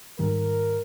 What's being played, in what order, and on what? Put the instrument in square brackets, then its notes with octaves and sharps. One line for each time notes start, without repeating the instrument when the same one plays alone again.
[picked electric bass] G#2 D#3 G3 [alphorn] A#4